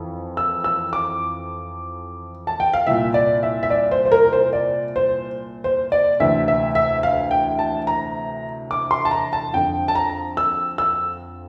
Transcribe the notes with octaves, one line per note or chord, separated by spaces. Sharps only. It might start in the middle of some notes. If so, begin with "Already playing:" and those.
Already playing: F2 E3
E6
E6
D6
A5
G5
F5
C2 A#2 E5
D5
E5
E5
D5
C5
C5
A#4
C5
D5
C5
C5
D5
D2 C3 E3 E5
E5
E5
F5
G5
A5
A#5
D6
C6
A5
A#5
A5
F2 D3 G5
A5
A#5
E6
E6